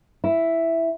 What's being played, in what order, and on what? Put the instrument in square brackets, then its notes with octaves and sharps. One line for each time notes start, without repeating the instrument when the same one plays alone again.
[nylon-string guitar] E4